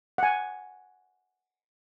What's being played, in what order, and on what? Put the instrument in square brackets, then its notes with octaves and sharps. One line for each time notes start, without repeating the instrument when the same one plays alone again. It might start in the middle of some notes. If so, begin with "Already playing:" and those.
[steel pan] F#5 G#5